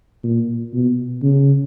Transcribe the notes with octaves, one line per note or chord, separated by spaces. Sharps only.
A#2
B2
C#3